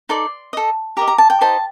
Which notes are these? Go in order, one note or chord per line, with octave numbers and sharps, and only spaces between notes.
D#4 A4 D5 C6
A4 D#5
G4 A#4 D#5 A#5
A#5
A5
G5
D#4 G4 C5 D#5 A5